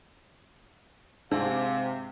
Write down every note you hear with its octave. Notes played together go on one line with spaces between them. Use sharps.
G#2 C3 D4 F5